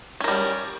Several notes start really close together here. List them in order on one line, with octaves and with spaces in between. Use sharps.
C#4 A#4 G3